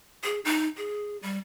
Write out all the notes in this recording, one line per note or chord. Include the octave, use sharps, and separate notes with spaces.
G#4
D#4
G#4
G3